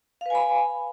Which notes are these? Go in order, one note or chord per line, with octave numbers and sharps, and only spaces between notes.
B4 F5 G#5 B5